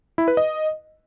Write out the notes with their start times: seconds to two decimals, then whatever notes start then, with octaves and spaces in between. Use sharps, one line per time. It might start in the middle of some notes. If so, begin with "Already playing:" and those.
0.18 E4
0.28 B4
0.37 D#5